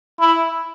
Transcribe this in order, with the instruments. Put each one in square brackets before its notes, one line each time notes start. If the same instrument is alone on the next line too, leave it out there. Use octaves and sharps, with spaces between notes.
[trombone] E4